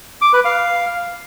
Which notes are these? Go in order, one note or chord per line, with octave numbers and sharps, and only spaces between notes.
D6
B4
F5